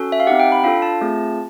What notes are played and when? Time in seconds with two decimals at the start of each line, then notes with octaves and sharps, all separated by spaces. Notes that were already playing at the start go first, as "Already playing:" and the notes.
Already playing: C#4 F#4 A4
0.12 E5
0.20 F5
0.27 C4 D#4 G4 F#5
0.40 G5
0.52 B5
0.64 D4 F4 A4 F5
0.82 A5
1.01 A3 C4 F4 G#4